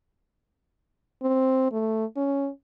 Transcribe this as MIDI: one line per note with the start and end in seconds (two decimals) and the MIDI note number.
1.22 1.69 60
1.72 2.05 57
2.16 2.49 61